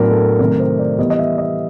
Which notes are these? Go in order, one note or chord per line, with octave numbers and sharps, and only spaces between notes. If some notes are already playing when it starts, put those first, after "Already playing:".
Already playing: A2 F#3 B3 D4 A#4
A4
C3 D#3 F#3 A3 A#4
C5
D5
E3 G3 B3 D#5
D#5
E5
D#5